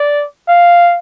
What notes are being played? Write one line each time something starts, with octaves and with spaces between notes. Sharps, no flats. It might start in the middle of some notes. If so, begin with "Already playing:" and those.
Already playing: D5
F5